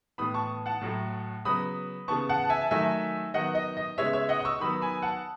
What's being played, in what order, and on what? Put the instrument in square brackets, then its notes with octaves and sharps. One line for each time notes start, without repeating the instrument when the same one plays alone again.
[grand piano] A2 E3 B3 B5 D#6
A5 C#6
F#5 A5
A2 F#3 A3
C#3 F#3 B3 B5 D#6
C#3 E3 B3 A5 C#6
F#5 A5
A5
E5 G#5
A5
D#3 F#3 A3 E5 G#5
D#3 F#3 B3 D#5 F#5
D#5
D#5
C#3 G#3 B3 C#5 E5
C#5 E5
D#5 F#5
D#6
C#6 E6
D#3 F#3 B3 B5 D#6
G#5 B5
F#5 A5